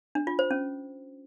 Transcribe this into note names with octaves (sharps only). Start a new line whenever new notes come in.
D4
F4
C5
C#4